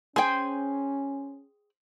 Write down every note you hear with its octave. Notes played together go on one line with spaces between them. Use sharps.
C#4 G#4 C5 G5 G#5